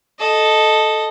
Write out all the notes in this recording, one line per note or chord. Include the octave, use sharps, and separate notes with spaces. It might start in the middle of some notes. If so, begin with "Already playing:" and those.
A4 D#5